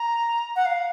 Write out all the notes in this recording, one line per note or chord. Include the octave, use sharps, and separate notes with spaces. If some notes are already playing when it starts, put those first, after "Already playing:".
Already playing: A#5
F#5
F5